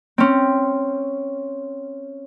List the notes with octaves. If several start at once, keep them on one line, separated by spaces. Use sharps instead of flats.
C4 C#4